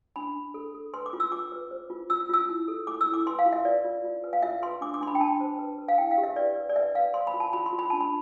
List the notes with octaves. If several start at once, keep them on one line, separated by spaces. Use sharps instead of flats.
D4 B5
D4
A4
A4
B4 C6
D6
F4
E6
F4 D6
B4
C5
F4
F4 E6
F4 E6
E4
A4
A4 D6
E6
E4
D6
B4 C6
F5
F4
E5
B4 D5
F4
F4
B4
F5
F4 E5
B4 C6
D4 D6
D6
D4 C6
B5
G5
D4 A5
C5
B4
B4
F5
E4 G5
F5
G4
E5
B4 D5
B4
D5
B4 E5
B4 F5
C5 C6
B5
F4
A5
F4 B5
C6
F4
B5
D4 A5
B5